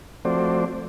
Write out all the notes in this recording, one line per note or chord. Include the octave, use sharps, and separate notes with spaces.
F3 A3 C4 F#4 C5 D5